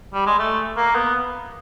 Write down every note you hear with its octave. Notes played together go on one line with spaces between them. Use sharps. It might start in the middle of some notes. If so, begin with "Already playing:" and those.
G3
G#3
A3
A#3
B3